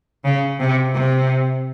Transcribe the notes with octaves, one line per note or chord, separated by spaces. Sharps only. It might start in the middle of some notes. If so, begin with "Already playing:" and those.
C#3
C3
C3